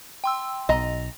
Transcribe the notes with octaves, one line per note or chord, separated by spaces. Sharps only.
G5 C6 E6
B1 D#5 A#5